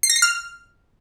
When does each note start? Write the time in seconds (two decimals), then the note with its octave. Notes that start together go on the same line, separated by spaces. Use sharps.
0.03 C7
0.10 A#6
0.16 C7
0.22 F6